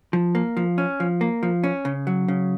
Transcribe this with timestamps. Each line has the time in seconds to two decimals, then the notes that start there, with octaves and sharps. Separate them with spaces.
0.13 F3
0.35 A#3
0.57 F3
0.78 C#4
1.00 F3
1.21 A#3
1.43 F3
1.64 C#4
1.85 C#3
2.07 F#3
2.28 C#3